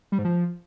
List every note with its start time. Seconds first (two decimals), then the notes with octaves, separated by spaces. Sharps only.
0.12 G3
0.18 G#2
0.25 F3